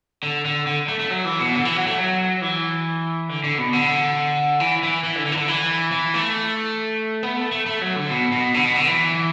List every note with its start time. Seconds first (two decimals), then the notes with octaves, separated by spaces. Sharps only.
0.23 D3
0.45 D3
0.67 D3
0.88 A3
0.99 A3
1.10 F#3
1.25 E3
1.40 B2
1.54 D3
1.65 E3
1.76 F#3
1.87 A3
1.98 F#3
2.42 E3
3.29 D3
3.44 D3
3.58 B2
3.73 D3
4.60 E3
4.83 E3
5.04 E3
5.15 D3
5.26 D3
5.32 E3
5.37 D3
5.48 E3
5.92 E3
6.14 A3
7.23 B3
7.37 A3
7.52 A3
7.66 A3
7.81 F#3
7.96 D3
8.10 B2
8.32 B2
8.54 D3
8.65 B2
8.76 D3
8.87 E3